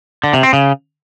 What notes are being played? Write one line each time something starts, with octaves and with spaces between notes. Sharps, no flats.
D3
C3
C4
C#3